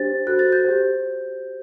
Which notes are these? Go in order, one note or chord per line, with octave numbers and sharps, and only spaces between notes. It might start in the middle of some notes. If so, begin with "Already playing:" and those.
Already playing: D4 G4 C5 A6
F#4 A4 C5 F#6
A6
G6
G4 C5